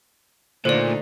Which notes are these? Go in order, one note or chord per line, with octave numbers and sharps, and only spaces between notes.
A#2 D3 A3 D#4 A4 C5 D5